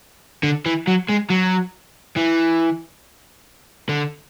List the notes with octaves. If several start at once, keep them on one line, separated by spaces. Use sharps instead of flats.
D3
E3
F#3
G#3
F#3
E3
D3